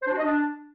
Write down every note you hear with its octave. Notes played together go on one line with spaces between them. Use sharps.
C5
D4
F#4
D#5
D4